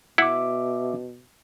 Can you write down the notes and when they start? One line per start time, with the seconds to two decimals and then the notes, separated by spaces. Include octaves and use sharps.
0.18 B2 E4 E5 F#5 D6